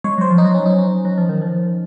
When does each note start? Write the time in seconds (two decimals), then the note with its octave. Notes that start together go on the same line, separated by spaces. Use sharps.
0.04 G#3 C#5
0.18 F#3 C5
0.31 F3
0.38 D#4
0.44 F#3
0.54 C#4
0.66 D#4
0.78 C#4
1.05 F#3
1.18 F3
1.29 D#3
1.42 F3